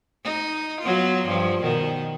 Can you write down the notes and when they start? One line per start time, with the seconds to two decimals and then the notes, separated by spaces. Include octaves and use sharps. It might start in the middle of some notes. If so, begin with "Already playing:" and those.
0.24 D#4
0.81 F#3 B3 F4
1.25 G2 F3
1.63 B2 D#3